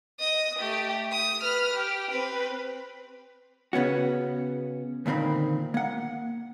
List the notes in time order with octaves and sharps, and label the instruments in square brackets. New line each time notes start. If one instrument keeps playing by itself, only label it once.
[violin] D#5 D#6
A3 G4
D#6
B4 F6
G4
C4 B4
[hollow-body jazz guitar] C#3 B3 C#4 F#4
D2 A#2 D#3 C4 B5
A#3 F#5